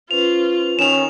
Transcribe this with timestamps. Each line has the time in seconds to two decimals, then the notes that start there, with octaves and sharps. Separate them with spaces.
0.11 C#4 F4 B4 C5 F7
0.79 D#3 C#4 E7 F7